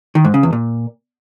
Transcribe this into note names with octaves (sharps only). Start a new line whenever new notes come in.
D#3
G#2
C#3
E2
A#2